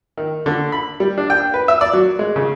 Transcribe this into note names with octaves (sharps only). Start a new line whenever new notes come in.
D#3
D3
B5
G3
D4
G5
B4
E5
D5
F#3
G#3
C#3